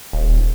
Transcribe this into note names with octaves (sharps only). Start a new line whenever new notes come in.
D#1